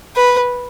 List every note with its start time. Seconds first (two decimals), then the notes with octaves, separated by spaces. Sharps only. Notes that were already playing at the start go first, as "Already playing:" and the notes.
0.15 B4